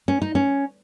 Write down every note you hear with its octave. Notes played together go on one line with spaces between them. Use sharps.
C#4
D#4
C#4